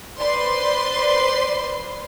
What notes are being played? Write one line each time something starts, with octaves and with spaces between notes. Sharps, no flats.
B4 C5 D5 C6